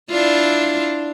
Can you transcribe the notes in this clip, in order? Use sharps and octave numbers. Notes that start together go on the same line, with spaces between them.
D4 E4 F4